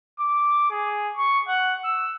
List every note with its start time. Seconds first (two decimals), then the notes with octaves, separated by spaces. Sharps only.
0.19 D6
0.71 G#4
1.17 C#6
1.48 F#5
1.84 E6